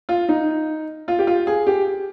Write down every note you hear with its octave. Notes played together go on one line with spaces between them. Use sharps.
F4
D#4
F4
G4
F4
G#4
G4